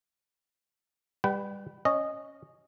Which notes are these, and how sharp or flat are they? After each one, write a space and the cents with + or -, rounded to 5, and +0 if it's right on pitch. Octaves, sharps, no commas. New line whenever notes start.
G3 +25 B4 +0 G5 -40
C#4 +0 D#5 -15